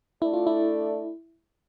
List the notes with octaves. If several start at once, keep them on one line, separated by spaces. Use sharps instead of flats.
A3 D4 E4 A4 D5
F4
E4